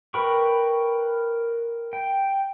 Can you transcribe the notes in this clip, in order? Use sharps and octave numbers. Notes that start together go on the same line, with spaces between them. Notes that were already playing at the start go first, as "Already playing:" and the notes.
A#4 B4 G5 B5 C#6
G5